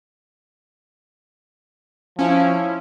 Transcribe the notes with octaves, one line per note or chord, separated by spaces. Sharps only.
F3 C#4 E4